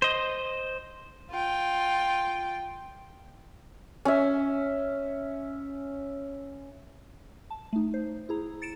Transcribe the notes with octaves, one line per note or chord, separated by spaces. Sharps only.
C5 D#5
F4 G5
C#4 E5
A5
A3 D#4
C5
E4 G#4 A#5
A6 C#7 D7 E7